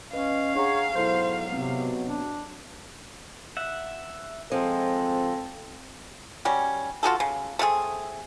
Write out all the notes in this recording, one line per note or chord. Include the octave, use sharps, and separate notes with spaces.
E2 C#4 B4 D#5 F5
D4 G#4 C#5 F#5 A#5
G#2 B2 F#3 E4 A4 C5 G6
C3 B3 C4
D4
E5 F#5
F3 G#3 C4 A4
F#3 G3 C#4
F4 F#4 G#4 A4
C#3
A3 C4 F4 G#4